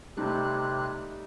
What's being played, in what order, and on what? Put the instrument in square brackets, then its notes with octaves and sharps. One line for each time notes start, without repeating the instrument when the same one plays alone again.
[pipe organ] C3 F#6 [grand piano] G3 A3 D#4